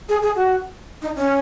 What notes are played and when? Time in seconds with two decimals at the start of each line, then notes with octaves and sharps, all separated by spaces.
0.09 G#4
0.22 G#4
0.36 F#4
1.02 D#4
1.15 C#4